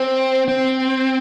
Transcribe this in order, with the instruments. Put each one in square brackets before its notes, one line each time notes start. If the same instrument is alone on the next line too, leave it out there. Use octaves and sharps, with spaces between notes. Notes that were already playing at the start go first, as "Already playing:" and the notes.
Already playing: [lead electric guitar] C4
C4